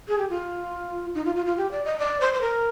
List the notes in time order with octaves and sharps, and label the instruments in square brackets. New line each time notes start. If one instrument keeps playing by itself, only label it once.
[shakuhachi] G#4
G4
F4
D#4
F4
F4
F4
G4
D5
D#5
D5
C5
C5
A#4